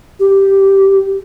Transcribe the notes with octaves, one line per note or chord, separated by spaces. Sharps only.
G4